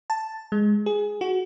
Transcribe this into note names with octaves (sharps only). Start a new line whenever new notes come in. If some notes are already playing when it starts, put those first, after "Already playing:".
A5
G#3
G#4
F#4